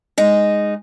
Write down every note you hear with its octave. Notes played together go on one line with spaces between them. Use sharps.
G#3 D#4